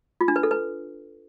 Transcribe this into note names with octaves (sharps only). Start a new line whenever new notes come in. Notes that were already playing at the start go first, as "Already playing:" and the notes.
F4
D4
B4
A4
B4